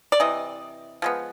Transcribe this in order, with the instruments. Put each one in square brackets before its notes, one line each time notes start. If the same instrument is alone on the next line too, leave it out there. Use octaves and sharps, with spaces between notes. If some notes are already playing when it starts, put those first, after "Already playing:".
[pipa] D5
C3 E3 D#5
F3 G#3 B3